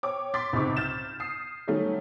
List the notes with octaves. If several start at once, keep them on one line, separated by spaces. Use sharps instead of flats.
C#5 G5 D6
C6 D6 A6 B6
C#2 G#2 C3 C4 C#6 D6
F6 G6 A6 E7
D#6 C7
D#3 F#3 G3 A3 C#4